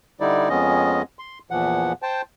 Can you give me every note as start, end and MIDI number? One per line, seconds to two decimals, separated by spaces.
0.20 0.49 50
0.20 0.49 55
0.20 0.49 63
0.20 0.49 64
0.20 0.49 74
0.49 1.02 41
0.49 1.02 56
0.49 1.02 59
0.49 1.02 61
0.49 1.02 75
1.19 1.39 84
1.51 1.93 40
1.51 1.93 46
1.51 1.93 52
1.51 1.93 53
1.51 1.93 78
2.02 2.22 72
2.02 2.22 79
2.02 2.22 81